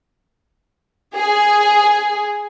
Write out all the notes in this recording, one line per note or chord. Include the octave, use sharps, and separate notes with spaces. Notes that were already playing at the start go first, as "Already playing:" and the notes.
G#4